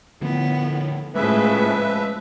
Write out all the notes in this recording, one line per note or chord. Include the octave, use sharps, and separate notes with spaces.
A2 D3 F3 B3
A2 C#3 F3 G#3 B4 E5